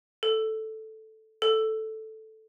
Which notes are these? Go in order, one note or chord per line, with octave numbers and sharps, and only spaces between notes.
A4
A4